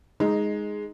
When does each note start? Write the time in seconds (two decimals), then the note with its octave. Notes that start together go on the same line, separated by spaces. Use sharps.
0.20 G#3 D#4